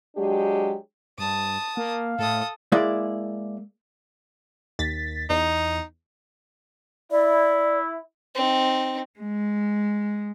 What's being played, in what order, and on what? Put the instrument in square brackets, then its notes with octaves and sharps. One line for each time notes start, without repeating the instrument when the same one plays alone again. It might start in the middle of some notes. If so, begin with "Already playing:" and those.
[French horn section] F#3 G#3 D4 G4
[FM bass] G2 [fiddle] A5 D#6
[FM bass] A#3 [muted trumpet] F5
[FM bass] A2 [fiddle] A4 D#6
[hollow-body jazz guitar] G#3 A#3 E4 D5
[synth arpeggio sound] D#2 A6 B6
[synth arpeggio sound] E2 [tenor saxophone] D#4
[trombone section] E4 [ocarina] D5
[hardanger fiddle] C4 D#4
[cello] G#3